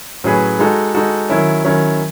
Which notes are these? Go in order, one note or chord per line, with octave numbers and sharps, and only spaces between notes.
A2 F#3 C#4 G#4 B4
G#3 D#4 F#4 A4
G#3 D#4 F#4 A4
D#3 F#3 C#4 E4
D#3 F#3 C#4 E4